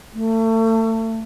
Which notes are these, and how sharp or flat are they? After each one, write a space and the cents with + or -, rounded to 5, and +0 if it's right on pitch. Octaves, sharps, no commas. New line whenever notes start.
A3 +30